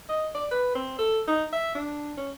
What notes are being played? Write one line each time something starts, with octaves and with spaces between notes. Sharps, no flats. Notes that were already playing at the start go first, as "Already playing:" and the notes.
D#5
D5
B4
C4
A4
D#4
E5
D4
C#4